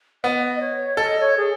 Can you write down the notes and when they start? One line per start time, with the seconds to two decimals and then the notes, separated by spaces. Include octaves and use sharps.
0.24 B3 D#5
0.61 C#5
0.96 A4 D#5
1.20 C#5
1.37 G#4